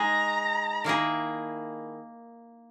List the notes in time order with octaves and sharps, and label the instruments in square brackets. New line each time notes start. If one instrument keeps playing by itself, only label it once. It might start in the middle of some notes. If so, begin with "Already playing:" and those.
Already playing: [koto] G#3 D#4 G#4 [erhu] A#5
[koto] D#3 A#3 E4 G#4